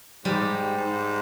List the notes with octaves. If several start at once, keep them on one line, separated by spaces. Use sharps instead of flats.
G#2 G3
G#2